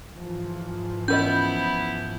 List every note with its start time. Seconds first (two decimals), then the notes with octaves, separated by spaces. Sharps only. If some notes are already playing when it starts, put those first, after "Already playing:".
0.15 G#2 E3 F3
1.08 B3 C#4 E4 A#4 D#5 G6